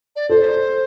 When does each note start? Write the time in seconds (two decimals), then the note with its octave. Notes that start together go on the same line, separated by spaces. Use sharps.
0.16 D5
0.29 A4 C5